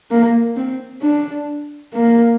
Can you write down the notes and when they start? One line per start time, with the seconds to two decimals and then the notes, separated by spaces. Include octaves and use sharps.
0.11 A#3
0.57 C4
1.02 D4
1.94 A#3